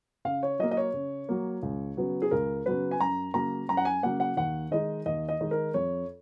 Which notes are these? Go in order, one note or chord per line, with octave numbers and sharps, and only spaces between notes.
C#3 F5
C#5
F#3 A#3 D#5
D#5
C#5
C#3
F#3 A#3
C#2
C#3 F#3 B3
G#4
C#2 A#4
C#3 F#3 B3 B4
G#5
F#2 A#5
C#3 F#3 A#3 A#5
F#2 A#5
F#5
G#5
C#3 F#3 A#3 F#5
F#5
D#2 F#5
D#3 G#3 D#4 D#5
D#2 D#5
D#5
D#3 G#3 D#4
A#4
F2 C#5